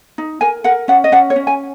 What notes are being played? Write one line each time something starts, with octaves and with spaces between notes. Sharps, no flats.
D#4
A#4 G#5
A#4 F#5
C#4 F#5
D#5
C#4 F#5
C#5
C#4
G#5